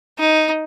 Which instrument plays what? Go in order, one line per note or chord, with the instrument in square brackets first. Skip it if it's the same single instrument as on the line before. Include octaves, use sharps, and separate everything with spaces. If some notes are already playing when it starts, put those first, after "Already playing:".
[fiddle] D#4